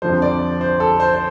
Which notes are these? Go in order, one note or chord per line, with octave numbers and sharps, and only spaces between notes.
F2 D3 F3 C5
D5
C5
A4
C5
C5